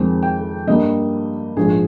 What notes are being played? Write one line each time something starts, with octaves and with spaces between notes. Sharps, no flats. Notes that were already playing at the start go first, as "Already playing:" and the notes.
Already playing: F2 D#3 G#3 C4
G5
G2 G3 A#3 D#5
A#1 G#2 F3 G#4